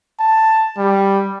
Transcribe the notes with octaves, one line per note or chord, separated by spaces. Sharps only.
A5
G3